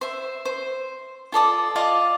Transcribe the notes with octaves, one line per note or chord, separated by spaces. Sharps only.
C5 E5
C5
F4 A4 D5 D#6
F4 D5 D#5 F5